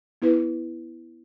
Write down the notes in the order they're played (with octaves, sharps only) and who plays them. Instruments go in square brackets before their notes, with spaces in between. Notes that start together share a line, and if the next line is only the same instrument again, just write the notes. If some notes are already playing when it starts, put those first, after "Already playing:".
[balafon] B3 E4 B4